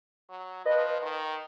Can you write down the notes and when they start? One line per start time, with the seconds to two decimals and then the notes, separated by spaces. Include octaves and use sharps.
0.29 F#3
0.65 F3 B4 D#5
1.02 D#3